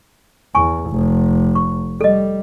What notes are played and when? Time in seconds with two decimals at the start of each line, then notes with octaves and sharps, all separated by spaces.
0.55 E2 G#5 C#6
0.90 F1
1.55 C#6
2.01 G3 A4 D#5